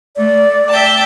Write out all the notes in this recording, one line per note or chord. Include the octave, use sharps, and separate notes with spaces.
A3 D5
E5 G5 A5